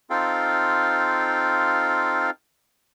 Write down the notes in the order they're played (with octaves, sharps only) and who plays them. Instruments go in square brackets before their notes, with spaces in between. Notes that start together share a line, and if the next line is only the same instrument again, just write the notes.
[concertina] C4 D#4 F4 A4 F5 G5